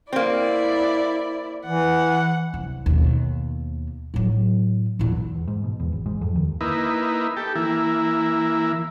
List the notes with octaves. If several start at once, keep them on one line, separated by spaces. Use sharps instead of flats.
A#3 C4 E4 D5
E3 F#5
C2
D#2 B2
A2 F#3
E2 A#2
E2
G#2
B2
E2
G#1
G#2
F2
D#2
A#3 D#4 E4 B4
G4 A4
E3 A#3 E4